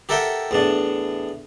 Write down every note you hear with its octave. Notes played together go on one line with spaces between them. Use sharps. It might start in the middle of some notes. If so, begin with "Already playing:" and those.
G4 A4 A#4 E5 F#5 G5
E2 A2 D4